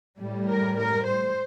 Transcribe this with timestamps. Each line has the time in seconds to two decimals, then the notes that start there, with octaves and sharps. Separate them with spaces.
0.20 A2 G3
0.48 A#4
0.76 A#4
1.04 C5